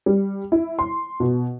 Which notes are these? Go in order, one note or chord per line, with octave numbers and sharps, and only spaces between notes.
G3
E4
C6
B2